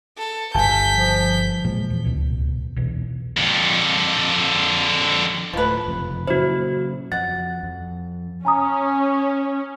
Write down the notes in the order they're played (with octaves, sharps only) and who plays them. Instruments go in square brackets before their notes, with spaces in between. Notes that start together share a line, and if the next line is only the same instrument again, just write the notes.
[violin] A4
[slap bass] G1 [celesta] G#5 A5 [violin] G6 B6
[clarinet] F3
[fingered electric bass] A#2 F3 F#3 G#3
E2
D1 C#2 B2
B1 E2 B2
[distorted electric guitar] F2 D3
[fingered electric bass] D1 A3 [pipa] F3 B4
[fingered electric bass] F#1 F2 C3
[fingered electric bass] A#2 C#3 F#3 [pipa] E4 [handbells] F#4 C5
[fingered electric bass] F2 [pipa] F#5 [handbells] A6
[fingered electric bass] F2
[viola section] C#4 [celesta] G#5 A#5 D#6